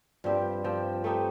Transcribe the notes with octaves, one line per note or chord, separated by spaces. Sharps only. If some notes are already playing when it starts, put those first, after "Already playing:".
G2 F3 C4 G4
F3 C4 G4
A3 C4 D#4 G4